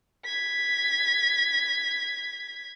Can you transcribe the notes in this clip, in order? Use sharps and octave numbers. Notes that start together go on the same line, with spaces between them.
G#6 B6